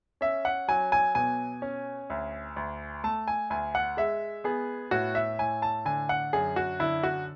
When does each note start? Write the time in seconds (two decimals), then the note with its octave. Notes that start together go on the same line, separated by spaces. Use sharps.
0.21 C#4 E5
0.45 F#5
0.68 F#3 G#5
0.92 G#5
1.15 B2 G#5
1.62 C#4
2.10 D2
2.56 D2
3.04 A3 A5
3.28 G#5
3.50 D2 G#5
3.75 F#5
3.97 G#3 E5
4.44 B3 G#4
4.91 A2 F#4
5.15 E5
5.39 A2 G#5
5.62 A5
5.85 D3 G#5
6.09 F#5
6.33 F#2 G#4
6.56 F#4
6.80 D3 E4
7.03 F#4